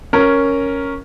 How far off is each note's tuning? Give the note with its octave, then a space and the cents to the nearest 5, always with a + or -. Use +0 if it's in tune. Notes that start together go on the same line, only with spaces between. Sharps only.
C#4 +0 A#4 +0